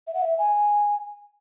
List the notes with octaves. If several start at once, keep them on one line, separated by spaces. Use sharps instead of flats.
E5
F#5
E5
G#5